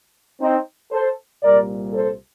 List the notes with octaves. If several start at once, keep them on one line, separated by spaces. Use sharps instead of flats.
C4 D#4
A4 C5
C2 A#2 G3 A#4 D5
A4 C5